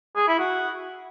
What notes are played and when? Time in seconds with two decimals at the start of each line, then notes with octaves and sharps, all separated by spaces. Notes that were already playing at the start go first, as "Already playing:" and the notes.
0.16 G#4
0.27 E4
0.39 F#4